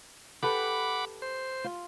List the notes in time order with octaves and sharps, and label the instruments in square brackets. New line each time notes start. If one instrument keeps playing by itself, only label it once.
[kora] G4 A4 B4 [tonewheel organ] F#5 B5 D6
[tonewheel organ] C5
[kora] F4